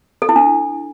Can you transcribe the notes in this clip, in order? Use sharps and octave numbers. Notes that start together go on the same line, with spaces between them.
A4
E4
D4